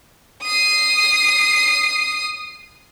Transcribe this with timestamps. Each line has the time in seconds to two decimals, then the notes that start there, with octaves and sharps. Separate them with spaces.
0.43 D#6 C7